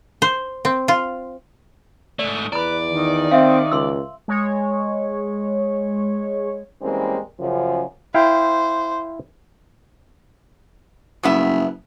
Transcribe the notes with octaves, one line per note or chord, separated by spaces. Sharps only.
C5
C4
F4
G#2 A3 D5
E2 B4 D5 A#5 B5
D#3
C4 E5 F5
C#2 C6 E6
G#3 C#5
E3 G3 G#3 A#3 C4 C#4
F#2 C#3 F3
E4 C5 F5 G5
F#1 G2 B3 E5